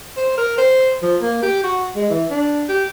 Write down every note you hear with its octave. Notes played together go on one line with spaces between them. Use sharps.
C5
A#4
C5
F3
A#3
G4
F#4
G#3
E3
D4
G4